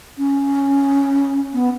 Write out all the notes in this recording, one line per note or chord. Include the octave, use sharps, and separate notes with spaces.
C#4
B3